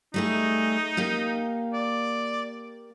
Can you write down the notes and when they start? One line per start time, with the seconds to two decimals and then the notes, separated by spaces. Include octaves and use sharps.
0.14 G3 A3 D#4 G#4
0.97 A#3 G4 F5
1.73 D5